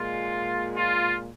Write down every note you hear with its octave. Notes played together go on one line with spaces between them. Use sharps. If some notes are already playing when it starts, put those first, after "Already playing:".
Already playing: A#2 G#3 F4
F4